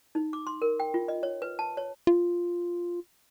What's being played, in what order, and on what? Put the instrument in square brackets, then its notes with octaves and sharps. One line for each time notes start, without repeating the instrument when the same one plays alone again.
[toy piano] D#4
D6
C6
A#4
G5
F4
D#5
C#5
B4
A5
C#5
[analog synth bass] F4